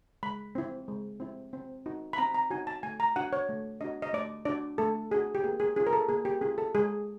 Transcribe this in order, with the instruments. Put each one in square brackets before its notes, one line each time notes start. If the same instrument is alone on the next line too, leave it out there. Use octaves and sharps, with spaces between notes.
[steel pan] G#3 B5
C4 E4
G#3
C4 E4
C4
D#4 F#4
B5
C4 A#5
A#5
D#4 F#4 G#5
A5
A3 G#5
A#5
D4 F#4 F#5
C#5
A3
D4 F#4 D#5
D#5
A3 D5
D4 F#4 D5
A3 A4
D4 F#4 G#4
G4
A#3 G#4
G#4
C#4 F4 G#4
A#4
A4
A#3 G#4
G4
C#4 F4 G#4
A4
G#3 G#4